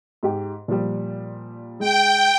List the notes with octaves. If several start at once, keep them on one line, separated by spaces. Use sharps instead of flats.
G#2 G4
A#2 F3 G3
G#3 G5